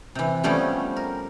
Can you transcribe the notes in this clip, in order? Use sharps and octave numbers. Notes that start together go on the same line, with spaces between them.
C3 E3
F3 G3 A3 B3 C#4 G4
A#4